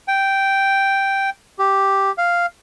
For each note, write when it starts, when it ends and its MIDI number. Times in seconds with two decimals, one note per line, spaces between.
0.08 1.30 79
1.59 2.12 67
2.18 2.46 77